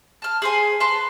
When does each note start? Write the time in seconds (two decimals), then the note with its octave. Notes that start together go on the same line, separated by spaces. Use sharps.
0.22 A5 F6
0.42 G#4 C5 G#5
0.80 B4 A5 C6